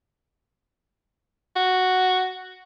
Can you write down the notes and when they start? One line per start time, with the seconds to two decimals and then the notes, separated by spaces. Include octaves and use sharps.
1.56 F#4